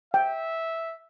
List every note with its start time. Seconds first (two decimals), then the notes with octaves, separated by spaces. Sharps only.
0.14 E5 G5